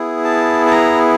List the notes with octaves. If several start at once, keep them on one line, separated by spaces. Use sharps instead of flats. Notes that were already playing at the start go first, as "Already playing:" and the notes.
Already playing: B3 E4 G#4
A5
A5
A#5